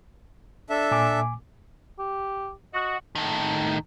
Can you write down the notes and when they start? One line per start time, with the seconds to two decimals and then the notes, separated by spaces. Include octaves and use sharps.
0.70 D4 A4 E5
0.91 A#2 G#5 D6
1.99 G4
2.73 F#4 D#5
3.15 A2 D#3